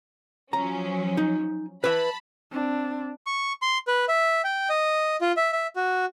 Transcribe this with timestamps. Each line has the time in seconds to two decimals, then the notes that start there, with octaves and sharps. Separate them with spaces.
0.53 F3 F#3 C#4 A#5
1.17 D#4
1.84 B4 E5 A5 B5
2.52 C4 D4
3.27 C#6
3.62 C6
3.88 B4
4.09 E5
4.44 G5
4.70 D#5
5.21 F4
5.37 E5
5.53 E5
5.76 F#4